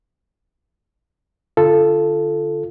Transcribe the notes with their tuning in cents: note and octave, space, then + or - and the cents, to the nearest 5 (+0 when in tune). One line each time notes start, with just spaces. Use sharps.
D3 +0 F4 -15 A4 +0